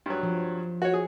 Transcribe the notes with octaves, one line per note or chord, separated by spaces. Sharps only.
G2 F#3
F3
F#4 C#5
G#4